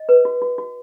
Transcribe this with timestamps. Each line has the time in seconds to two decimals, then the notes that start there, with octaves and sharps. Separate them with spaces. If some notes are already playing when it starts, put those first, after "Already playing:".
Already playing: D#5
0.09 B4
0.25 F#4
0.42 F#4
0.58 F#4